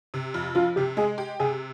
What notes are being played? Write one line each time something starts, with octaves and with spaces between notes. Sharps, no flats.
C3
F2
F3 F4
C3 G4
G#3 G#4
G4
C3 G#4